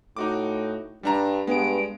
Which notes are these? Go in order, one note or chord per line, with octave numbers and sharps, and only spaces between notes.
A2 D#4 F#4 D6
G2 G3 D4 A#5
G2 G#3 B3 D7